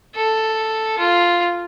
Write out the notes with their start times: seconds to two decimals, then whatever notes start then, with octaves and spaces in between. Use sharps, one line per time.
0.15 A4
0.98 F4